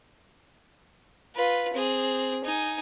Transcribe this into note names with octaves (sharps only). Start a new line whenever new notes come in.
F4 B4
C4 G#4
D#4 G#5